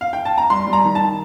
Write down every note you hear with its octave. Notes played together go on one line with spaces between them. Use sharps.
F5
G5
A5
A#5
G3 C6
G3
A#5
D#3
A5